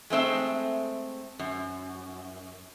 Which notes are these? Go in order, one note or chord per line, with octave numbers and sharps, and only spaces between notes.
G#3 A3 C4 E5
F#2